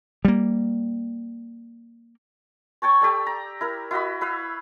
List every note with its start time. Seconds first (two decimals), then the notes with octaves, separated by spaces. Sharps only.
0.25 G3 A#3
2.82 C#5 G5 A5 C#6
3.02 G4 A4 D5
3.27 A#5
3.61 E4 A#4
3.91 E4 F#4 D#5 B5
4.21 E4 B4 E5 F5